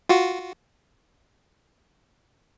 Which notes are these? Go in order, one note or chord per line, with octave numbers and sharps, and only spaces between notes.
F4 F#4